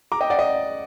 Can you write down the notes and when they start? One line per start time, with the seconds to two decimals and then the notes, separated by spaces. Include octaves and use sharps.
0.12 A#5 D6
0.21 D#5 G5
0.30 D5 F#5
0.39 D#5